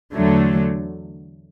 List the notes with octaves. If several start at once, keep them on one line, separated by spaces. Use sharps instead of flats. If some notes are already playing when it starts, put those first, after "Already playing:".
E2 D3 F#3 A3